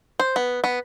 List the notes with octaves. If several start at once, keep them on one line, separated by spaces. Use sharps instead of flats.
C5
B3
B3